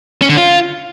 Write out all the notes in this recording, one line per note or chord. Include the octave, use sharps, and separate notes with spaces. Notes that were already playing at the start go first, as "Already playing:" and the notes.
C#4
D3
F4